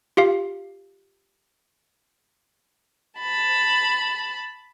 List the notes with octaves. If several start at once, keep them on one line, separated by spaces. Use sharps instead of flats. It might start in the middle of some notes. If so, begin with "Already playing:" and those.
F4 G4 F5
A5 B5